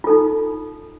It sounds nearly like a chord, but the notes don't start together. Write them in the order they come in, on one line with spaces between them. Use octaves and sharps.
F4 A4 D#4